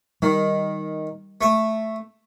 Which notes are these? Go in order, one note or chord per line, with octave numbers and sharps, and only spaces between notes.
D#3 G3
A3 E5